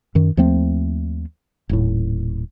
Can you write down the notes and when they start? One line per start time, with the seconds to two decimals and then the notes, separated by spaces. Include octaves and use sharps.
0.15 F#2 D#3
0.37 D#2 F3 A3 C4
1.69 D#1 A2